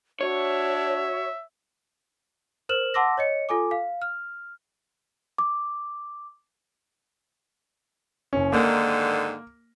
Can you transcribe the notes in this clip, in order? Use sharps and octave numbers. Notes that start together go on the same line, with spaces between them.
D4 F#4 C#5 E5
A#4 C5 F6 E7 F#7
F#5 A5 C6 D6 E6 A#6
C#5 D#5 C#7
F4 A4 G#5 D6
F5
F6
D6
F#1 C#4
G#2 D3 D#3 A#3